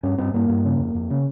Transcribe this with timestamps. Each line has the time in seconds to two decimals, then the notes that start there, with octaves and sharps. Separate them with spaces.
0.03 G2 C#4
0.18 G2 C4
0.34 G2 A#3
0.49 G2
0.65 C#3
0.80 F2
0.95 F2
1.10 C#3